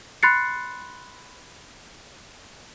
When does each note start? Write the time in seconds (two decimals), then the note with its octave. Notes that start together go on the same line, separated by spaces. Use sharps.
0.23 B5 C6 F#6 A6 C7 C#7